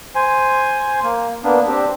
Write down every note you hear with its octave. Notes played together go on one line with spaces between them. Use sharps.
C5 G#5
A#3
A#3 B3 D4
C4 D4 G4